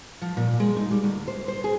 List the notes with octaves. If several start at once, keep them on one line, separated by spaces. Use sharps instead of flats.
F3
A#2
G#3
D#4
G3
D2
C5
C5
G#4